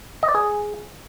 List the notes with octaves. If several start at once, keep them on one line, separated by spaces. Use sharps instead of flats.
D#5
D5
G#4